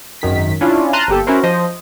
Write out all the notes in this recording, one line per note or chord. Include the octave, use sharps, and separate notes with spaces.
G#1 F#2 D#3 B6
C#4 D4 E4 F4
A5 A#5 C6 F6 F#6 D#7
G1 A#3 G4 A4
C#4 E4 F#4 A#4 C5
F3 C5 D#5